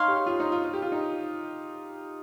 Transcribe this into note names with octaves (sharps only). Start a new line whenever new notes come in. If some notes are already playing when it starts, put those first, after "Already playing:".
Already playing: D#4 C#5 F5 C6
G4
F4
D#4
F4
F4
G4
F4
D#4